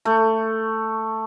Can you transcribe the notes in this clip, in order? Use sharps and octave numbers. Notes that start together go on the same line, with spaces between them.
A3